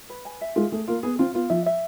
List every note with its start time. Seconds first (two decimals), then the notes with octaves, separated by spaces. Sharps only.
0.10 B4
0.25 G#5
0.41 E5
0.56 G#3 F4
0.72 A3 G#4
0.88 A#3 F4
1.03 B3 G#4
1.19 C4 F4
1.34 B3 F4
1.50 F3 E5
1.66 E5